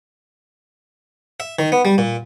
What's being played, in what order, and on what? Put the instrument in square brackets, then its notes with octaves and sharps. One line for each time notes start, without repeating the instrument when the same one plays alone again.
[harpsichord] E5
D#3
B3
G3
A#2